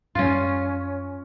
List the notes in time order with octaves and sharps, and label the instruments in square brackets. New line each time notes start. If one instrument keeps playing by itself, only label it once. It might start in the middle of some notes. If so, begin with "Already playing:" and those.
[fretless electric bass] F#2 G3 [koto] C#4 F4